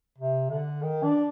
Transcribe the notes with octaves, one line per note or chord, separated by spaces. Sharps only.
C3
D3
D#3
D4